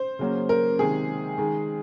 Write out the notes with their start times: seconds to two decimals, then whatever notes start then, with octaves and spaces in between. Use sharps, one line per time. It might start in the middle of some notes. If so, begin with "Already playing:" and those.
Already playing: C5
0.19 C#3 F#3 A#3
0.49 A#4
0.79 C3 D#3 G#3 G#4
1.38 D#3 G#3